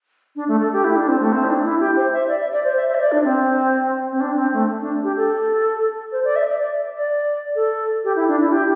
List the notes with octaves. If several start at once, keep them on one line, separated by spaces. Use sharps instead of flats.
D4
A3
A4
G4
E4
D4
C4
A3
C4
E4
D4
E4
G4
C5
E5
D5
E5
D5
C5
E5
E5
C5
D5
D4
C4
C4
D4
C4
A3
D4
G4
A4
C5
D5
E5
D5
D5
D5
A4
G4
E4
D4
E4
G4